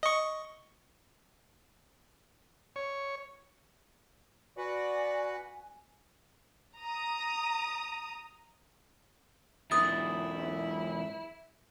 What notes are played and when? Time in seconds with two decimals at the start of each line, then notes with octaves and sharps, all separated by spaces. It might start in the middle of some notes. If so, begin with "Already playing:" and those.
0.03 D#5 C#6
2.76 C#5
4.57 F#4 B4 D5 F#5 G#5
6.80 A#5 D#6
9.71 E2 G#2 E4 D#6 A6